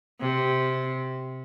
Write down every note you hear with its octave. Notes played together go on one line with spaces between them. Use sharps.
C3